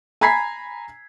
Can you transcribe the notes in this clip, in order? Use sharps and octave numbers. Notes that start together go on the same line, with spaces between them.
G#5 A#5 B5 G#6 B6 C7